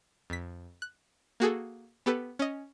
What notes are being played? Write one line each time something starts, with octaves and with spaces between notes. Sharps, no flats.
F2 B6
F#6
A#3 F#4 G#4 A4
B3 G4 A4 B4
C#4 D#5